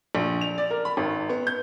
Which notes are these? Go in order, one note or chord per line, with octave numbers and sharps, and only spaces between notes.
A#1
F7
D5
A#4
B5
G#1
B3
G6